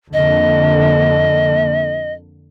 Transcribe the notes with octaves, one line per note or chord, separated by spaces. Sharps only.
F2 D3 A#3 D#5